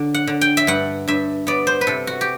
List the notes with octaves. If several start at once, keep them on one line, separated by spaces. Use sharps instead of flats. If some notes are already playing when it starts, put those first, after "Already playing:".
Already playing: D3
F#5
D3
G5
E5
G2 F#5
G2 E5
B3 D5
C5
B4
C3 A4
F#4
G4